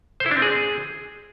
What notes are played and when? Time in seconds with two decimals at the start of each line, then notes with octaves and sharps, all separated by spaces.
0.20 C5
0.26 E4
0.31 D4
0.37 C4
0.42 G#4